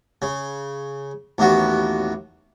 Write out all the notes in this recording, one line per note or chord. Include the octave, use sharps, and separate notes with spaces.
C#3
A1 D#2 B3 F#4